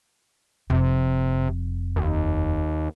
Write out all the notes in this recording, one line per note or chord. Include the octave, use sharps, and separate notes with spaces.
F1 F2 C3
D#2